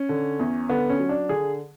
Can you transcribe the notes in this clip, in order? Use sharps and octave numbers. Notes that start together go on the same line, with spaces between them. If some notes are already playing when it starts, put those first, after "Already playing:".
Already playing: C#4
D3
E2
D3 B3
C#4
F#3
D4
D3 G#4